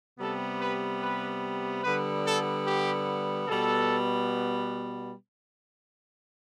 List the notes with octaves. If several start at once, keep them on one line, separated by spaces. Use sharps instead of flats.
C3 G3 B3 A4
B4
B4
D3 G3 B3 B4
A4
G4
B2 G3 B3 A4